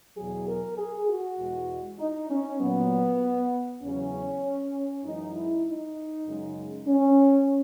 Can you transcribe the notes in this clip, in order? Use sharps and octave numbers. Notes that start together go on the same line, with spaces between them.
E2 B2 F#3 G#4
A#4
G#4
F#4
E2 B2 G#3
D#4
C#4
A#2 F#3 B3
E2 C#3 F#3 C#4
F#2 E3 G#3 D#4
E4
D#4
F#2 C#3 G#3
C#4